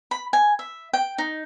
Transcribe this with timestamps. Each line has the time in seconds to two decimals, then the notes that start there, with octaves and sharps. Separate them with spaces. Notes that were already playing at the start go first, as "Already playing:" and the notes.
0.11 B5
0.33 G#5
0.59 E5
0.93 G5
1.18 D#4